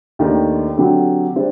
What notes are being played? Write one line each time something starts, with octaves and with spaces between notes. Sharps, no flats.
D#2 D#3 A3 D4
D3 F#3 C4 G4
G3 D4 G4 C5